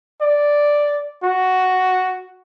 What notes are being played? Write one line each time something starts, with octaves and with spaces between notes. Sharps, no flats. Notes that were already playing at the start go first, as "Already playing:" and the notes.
D5
F#4